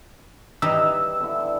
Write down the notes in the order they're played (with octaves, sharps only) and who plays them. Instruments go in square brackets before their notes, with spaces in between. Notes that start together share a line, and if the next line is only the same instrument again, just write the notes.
[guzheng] E3 G3 D#4 [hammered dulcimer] G4 [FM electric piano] E6
[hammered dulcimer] D3 B3 E4